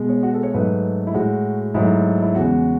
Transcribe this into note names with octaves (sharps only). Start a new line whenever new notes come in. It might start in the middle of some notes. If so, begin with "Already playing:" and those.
Already playing: B2 G#3
C#5
F#4
A4
C#5
G#2 F#3 A3 B4
E4
A2 G#3 F#4
G#2 F#3 A3 E4
E4
E2 C#3 G#3 F#4